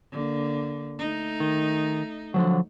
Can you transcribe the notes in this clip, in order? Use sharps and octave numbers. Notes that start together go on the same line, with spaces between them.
D3 A#3
A3 D#4
D#3
D3 F3 F#3